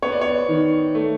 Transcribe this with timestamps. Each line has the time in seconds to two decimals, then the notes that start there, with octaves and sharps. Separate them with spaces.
0.02 B3 C#5
0.12 D5
0.21 C#5
0.49 D#3
0.95 A3